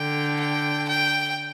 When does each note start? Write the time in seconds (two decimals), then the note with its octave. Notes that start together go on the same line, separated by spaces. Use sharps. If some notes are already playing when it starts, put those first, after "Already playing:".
Already playing: D3 G5
0.40 G5
0.89 G5